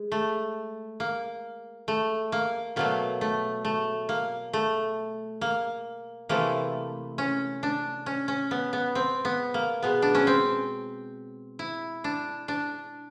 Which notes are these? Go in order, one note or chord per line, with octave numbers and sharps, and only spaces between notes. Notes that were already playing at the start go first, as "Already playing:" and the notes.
Already playing: G#3
A3
A#3
A3
A#3
B2 F#3 A3 A#3
A3
A3
A#3
A3
A#3
C3 E3 A3 A#3
C#4
D4
C#4
C#4
B3
B3
C4
B3
A#3
B2 G#3 B3
D4
C#4
C4
E4
D4
D4